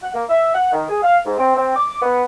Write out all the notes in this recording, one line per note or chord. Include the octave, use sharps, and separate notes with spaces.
F#5
A#3
E5
F#5
D#3
G#4
F5
G#2
C4
C4
D6
B3